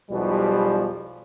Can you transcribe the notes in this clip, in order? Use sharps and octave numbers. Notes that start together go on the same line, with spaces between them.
B1 E2 B2 F3 G3